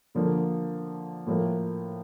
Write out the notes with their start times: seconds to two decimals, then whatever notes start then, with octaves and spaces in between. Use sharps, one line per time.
0.15 D3 F3 A#3
1.26 A2 F3 A#3